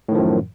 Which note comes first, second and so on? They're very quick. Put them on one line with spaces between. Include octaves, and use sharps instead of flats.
A2 D#3 F3 F#2